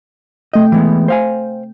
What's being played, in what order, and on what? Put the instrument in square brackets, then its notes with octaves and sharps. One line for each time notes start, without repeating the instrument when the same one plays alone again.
[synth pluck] C3 A3 G5 [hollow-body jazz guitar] D#5
[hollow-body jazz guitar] E3 G#3 B3
C5 F5 G#5